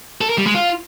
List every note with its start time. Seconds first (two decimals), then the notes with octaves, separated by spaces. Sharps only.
0.21 A4
0.30 A#4
0.38 G3
0.46 G#3
0.55 F4